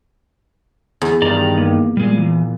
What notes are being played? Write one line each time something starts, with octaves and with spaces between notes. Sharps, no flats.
E2
G2 D#3 D5 A#5
A#3
A#2 G3 G#3
E3